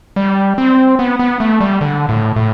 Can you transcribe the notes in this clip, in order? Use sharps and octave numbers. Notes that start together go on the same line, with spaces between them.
G3
C4
B3
B3
A3
G3
D3
A2
A2